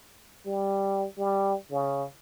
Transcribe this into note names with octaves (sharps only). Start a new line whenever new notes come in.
G3
G3
C#3